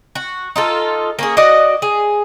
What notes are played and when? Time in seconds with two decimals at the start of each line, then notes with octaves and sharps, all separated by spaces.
0.15 F#4
0.56 D#4 F4 A4
1.19 A#3 C#4 G#4
1.37 F#4 D5 D#5
1.82 G#4